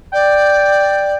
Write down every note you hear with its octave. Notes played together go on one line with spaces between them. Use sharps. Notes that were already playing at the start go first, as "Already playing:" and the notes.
D5 G5